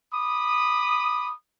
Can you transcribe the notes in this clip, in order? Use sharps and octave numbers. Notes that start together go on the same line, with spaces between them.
B5 D6 D#6